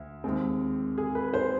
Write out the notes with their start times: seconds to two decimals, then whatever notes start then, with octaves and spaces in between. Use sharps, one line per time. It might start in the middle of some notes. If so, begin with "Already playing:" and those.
Already playing: D2
0.24 D#2 D#3 G#3 C4
0.98 G#4
1.15 B4
1.34 C5